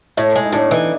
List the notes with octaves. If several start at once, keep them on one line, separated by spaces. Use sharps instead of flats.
A2 E4
G#3
D#4
A2 D4
E3 D#4